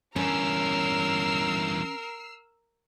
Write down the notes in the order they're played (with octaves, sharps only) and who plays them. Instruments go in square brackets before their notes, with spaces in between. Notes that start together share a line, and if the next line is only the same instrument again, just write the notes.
[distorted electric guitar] E2 G2 [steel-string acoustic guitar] C#4 [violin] A#4 [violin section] E6 F6 C7